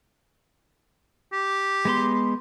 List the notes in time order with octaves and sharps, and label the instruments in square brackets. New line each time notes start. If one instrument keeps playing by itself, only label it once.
[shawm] G4
[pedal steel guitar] G#3 B3 C6